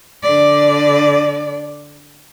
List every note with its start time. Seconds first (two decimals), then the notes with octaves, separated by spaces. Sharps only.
0.23 D3 D5